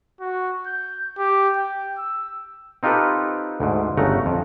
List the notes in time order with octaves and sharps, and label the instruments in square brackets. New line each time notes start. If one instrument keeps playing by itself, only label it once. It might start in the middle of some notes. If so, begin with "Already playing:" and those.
[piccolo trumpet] F#4
G6
G4
G5
E6
[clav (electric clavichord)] C4 D#4 F4 G4 A4 B4
D2 G#2
G1 C#3 A3 F#5 A#5
F2